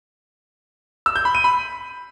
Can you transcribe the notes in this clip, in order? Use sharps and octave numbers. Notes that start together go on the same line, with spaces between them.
E6
G6
B5
D#7
B5